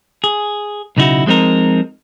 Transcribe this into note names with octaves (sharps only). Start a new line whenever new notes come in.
G#4
B1 C#3 D#4 E4 F#4
F3 G#3 C4 D#4 A#4